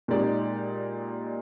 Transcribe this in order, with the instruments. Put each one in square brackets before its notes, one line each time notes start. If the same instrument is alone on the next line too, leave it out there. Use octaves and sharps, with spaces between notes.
[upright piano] A#2 G#3 D#4 G4 D5